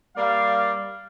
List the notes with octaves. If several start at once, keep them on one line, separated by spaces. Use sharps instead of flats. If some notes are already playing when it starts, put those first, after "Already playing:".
G3 A#3 D5 F5